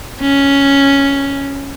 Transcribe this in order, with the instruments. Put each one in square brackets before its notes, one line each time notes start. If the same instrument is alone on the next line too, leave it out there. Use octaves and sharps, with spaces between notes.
[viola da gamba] C#4